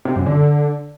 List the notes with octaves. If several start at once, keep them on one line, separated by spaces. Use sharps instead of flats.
C3
F#2
D3